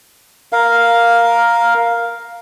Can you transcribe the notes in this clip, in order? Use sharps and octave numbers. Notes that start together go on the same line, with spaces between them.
A#4 F5